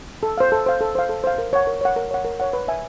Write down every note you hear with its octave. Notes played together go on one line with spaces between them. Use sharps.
A4
C5 F5
A4
C5 F5
A4
C5 F5
A4
C5 F5
A#4
C#5 F#5
A#4
C#5 F#5
A#4
C#5 F#5
A#4
C#5 F#5
B4
E5 G#5